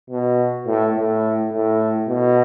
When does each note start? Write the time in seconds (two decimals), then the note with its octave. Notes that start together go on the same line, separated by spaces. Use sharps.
0.10 B2
0.66 A2
0.95 A2
1.52 A2
2.09 B2